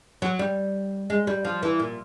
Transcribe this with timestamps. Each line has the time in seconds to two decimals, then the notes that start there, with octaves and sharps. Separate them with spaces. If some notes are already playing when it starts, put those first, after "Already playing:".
0.22 F#3
0.39 G3
1.10 G#3
1.27 G3
1.45 F3
1.63 E3
1.80 A#2